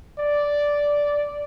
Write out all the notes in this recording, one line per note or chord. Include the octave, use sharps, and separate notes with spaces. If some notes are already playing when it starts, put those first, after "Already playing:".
D5